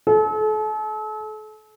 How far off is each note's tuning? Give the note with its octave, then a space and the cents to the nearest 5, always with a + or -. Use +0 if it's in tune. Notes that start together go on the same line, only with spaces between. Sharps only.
A4 -40